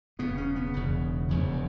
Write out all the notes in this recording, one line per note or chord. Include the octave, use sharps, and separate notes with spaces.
E1 E2 C#3 B3
C#4
B3
E1 E2 C#3
E1 E2 C#3